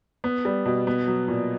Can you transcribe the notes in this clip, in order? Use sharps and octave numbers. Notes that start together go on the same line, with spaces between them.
B3
G3
B2
B3
F#3
A#2